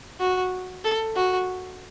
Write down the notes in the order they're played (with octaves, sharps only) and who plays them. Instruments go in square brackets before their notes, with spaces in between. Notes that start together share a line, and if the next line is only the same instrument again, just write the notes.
[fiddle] F#4
A4
F#4